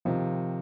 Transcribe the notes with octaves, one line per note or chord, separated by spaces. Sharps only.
C3 D#3 F3